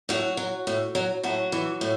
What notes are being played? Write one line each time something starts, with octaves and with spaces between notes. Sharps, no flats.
A2 F#3 F#4
F#3
A2
F#3
A2 F#3 F#4
E3
A2